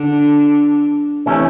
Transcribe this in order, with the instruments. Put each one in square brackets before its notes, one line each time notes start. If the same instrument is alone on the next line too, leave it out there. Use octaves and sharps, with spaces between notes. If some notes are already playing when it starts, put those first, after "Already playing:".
Already playing: [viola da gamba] D3 D4
[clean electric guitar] C3 E3 A3 C#4